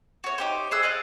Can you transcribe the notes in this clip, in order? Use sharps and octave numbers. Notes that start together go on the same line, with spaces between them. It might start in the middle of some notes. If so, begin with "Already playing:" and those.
F#4 C#5
D#4 G4 C5
G#4 C5 E6 F#6
D5 D#5 F5 F#5